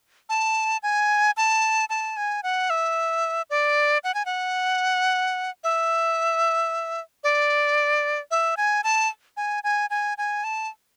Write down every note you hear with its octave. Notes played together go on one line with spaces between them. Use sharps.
A5
G#5
A5
A5
G#5
F#5
E5
D5
F#5
G#5
F#5
E5
D5
E5
G#5
A5
G#5
G#5
G#5
G#5
A5